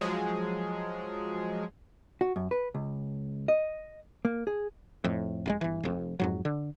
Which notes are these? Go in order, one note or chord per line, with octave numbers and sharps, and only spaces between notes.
F3 F#3 G#3 G#4
F#4
F#2
B4
C#2
D#5
A#3
G#4
F2 A2
F1 A#2 G#3
G1 E3
F1 F2
F2 G#2 F#3
D3